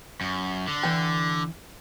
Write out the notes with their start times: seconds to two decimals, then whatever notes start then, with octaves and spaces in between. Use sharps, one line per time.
0.21 F#2
0.67 D3
0.83 E3 G5